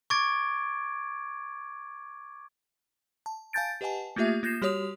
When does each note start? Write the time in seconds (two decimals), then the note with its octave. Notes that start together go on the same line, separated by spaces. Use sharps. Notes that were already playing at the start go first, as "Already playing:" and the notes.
0.10 C#6 D6 G#6 A6 D7
3.26 A5
3.53 F5 G#5 A5 G6 A6 D7
3.81 G4 B4 D#5 F#5 G#5 A5
4.16 A3 A#3 F4 G4 E5
4.43 A#3 F4 G6 A#6 C7 E7
4.62 G3 F#4 G4 C#5 D#6 F7